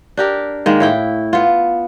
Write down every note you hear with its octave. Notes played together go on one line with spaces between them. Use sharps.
D4 G4 A#4
D#3 G#3 A#3
A2 E4 G5
B3 F4